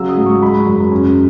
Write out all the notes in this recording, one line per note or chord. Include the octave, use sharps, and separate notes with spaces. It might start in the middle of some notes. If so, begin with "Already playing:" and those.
Already playing: C#3 F#3 E6
D#6
G#2
C#6
G#3 B5
F#2
C#4